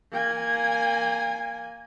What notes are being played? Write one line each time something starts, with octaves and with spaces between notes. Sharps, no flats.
A#3 G#5